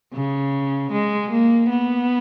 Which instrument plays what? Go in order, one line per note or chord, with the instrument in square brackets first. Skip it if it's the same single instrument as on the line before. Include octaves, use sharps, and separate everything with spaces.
[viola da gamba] C#3
G#3
A#3
B3